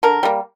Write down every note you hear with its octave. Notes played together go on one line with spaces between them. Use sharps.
D3 A#4
G3 A#3